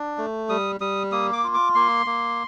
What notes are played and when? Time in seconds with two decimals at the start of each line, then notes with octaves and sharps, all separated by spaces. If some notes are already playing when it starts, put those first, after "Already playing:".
Already playing: D4
0.18 A3
0.49 G3 D#6
0.81 G3 D#6
1.12 A#3 D#6
1.33 D6
1.44 F4
1.54 D6
1.75 A#3 C6
2.06 A#3